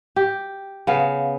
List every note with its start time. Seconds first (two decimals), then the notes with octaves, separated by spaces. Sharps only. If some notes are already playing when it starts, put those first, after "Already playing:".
0.16 G4
0.87 C#3 B3 F5